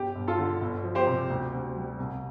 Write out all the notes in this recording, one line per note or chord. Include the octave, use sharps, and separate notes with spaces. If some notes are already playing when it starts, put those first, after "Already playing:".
Already playing: G1 G4
G1
F4 A4
D3
G1
F3
G4 C5
C3
D2
D2
G3
C2